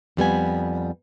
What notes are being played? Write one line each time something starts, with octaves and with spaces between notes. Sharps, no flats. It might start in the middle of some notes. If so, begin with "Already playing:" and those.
F2 G3 B3 G#5